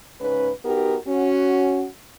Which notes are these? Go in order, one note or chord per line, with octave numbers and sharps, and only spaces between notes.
G#2 C#3 C#4 B4
B3 D#4 F#4 G4 A#4
C#4 F#4